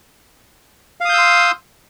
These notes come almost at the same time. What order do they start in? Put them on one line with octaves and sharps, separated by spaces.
F5 D#6 G6 E6 C6